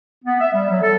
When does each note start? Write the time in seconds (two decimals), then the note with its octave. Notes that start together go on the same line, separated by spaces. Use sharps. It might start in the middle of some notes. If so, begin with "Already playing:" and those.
0.25 B3
0.41 E5
0.54 G3
0.70 F#3
0.82 A4